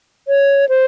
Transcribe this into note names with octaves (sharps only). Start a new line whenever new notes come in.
C#5
C5